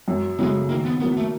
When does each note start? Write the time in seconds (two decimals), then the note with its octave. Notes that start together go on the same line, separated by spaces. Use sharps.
0.08 F#2
0.39 C#3 F#3 G#3 A3
0.69 D#3 A#3
0.85 B3
1.00 F#3 A#3 B3
1.17 A3